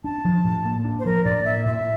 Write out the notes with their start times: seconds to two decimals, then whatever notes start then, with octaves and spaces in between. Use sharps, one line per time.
0.04 D4 A5
0.25 F3
0.44 A2
0.65 A#3
0.84 D4
0.99 C5
1.05 F3 A#4
1.25 A2 D5
1.45 A#3 E5
1.66 A2 E5